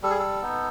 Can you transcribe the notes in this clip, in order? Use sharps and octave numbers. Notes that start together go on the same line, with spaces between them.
G3 A4
G#4
A4
B3 D#4